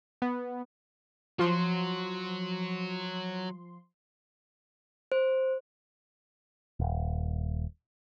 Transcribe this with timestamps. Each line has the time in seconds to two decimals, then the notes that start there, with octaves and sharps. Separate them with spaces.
0.22 B3
1.39 F3 F#3 C6
5.12 C5
6.80 D#1